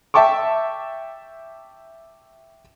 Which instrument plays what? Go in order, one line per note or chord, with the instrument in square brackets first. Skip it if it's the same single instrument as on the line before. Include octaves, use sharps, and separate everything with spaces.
[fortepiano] E5 G5 A5 C#6 D6